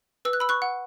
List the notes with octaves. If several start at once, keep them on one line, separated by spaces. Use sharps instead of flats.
B4 E6
F#6
B5 E6
C#6 F#6
F#5